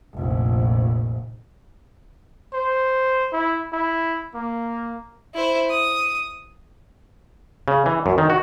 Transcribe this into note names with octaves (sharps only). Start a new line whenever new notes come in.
F1 A#1
C5
E4
E4
A#3
E4 C5
D#6
C#3
E3
F#2
D#3
F#4